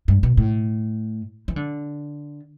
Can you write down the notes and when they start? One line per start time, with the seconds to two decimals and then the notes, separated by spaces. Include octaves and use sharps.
0.08 G2
0.23 B2
0.37 A2
1.48 E3
1.56 D3